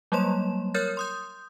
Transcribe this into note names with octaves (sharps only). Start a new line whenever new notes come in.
F#3 G3 A#3 C#5 C6 E7
A#4 C#5 F6 G6 A6
C6 D#6 G6